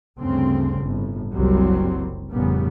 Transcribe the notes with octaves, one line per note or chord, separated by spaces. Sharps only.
D2 G2 C#3 C4
G1 A2
F#1 C2 F#3 G3 C4
F1 A#2 C#3 G3 B3